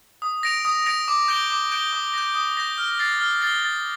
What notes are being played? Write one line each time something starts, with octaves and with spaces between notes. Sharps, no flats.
D#6
A#6 D7 F7
D#6
A#6 D7 F7
D6
G6 D7 G7
D6
G6 D7 G7
D#6
G6 A#6
D#6
G6 A#6
F6
A6 C7 G7
F6
A6 C7 G7
A6